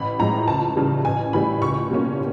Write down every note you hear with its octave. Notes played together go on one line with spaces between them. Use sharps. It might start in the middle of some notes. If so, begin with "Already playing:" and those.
Already playing: A1 B5
A2 F3 G#3 A#5
C#2 A5
C#3 E3 G3
A1 G#5
A2 E3 G3 B5
C#2 C#6
B2 G3 A#3 C#4